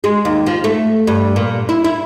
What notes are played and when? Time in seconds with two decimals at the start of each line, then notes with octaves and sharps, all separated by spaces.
0.04 G#3
0.25 D#2
0.46 F3
0.64 A3
1.07 G2
1.36 A#2
1.69 E4
1.84 E4